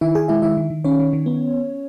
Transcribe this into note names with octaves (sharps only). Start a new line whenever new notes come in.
D#3 E4 E5
D#3 G#4 G#5
G#3 E4 E5
D#3 E4 E5
D#3
D#3
D#3 C#4 C#5
D#3
D#3
B3